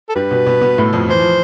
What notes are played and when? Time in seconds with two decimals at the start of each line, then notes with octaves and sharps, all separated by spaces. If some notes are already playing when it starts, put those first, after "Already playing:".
0.09 A4
0.15 G2 G3 B4
0.31 B2 B3
0.46 B2 B3
0.61 B2 B3
0.78 A2 A3
0.93 F2 F3
1.09 E3 C5
1.19 F3